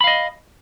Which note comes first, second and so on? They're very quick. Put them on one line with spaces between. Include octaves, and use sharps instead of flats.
B5 F5 D#5